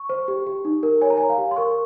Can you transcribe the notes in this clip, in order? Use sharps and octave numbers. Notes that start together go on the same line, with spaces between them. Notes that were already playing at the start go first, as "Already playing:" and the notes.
Already playing: C#6
C5
G4
G4
D#4
A#4
C#5 G#5
A#5
C#5 G#5
F5
G4
C6
A#4 C#6